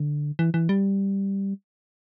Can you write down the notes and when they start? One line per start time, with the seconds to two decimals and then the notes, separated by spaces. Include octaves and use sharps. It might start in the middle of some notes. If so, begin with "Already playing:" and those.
Already playing: D3
0.39 E3
0.54 E3
0.69 G3